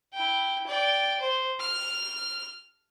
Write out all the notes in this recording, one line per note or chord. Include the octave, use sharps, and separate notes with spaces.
E4 G5
D5 G5
C5
F6